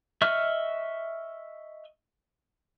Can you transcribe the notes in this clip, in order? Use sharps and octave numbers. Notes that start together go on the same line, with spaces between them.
D#5 E5 C#6 F6 F#6